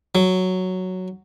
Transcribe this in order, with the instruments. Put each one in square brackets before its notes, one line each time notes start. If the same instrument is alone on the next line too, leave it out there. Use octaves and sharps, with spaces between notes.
[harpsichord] F#3